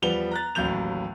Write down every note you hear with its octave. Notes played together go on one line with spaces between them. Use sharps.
E2 F3 G3 B3 F7 G7
A#5 F#6 A6
A1 D#2 F#3 G6 F7